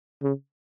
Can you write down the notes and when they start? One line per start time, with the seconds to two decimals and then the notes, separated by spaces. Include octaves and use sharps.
0.23 C#3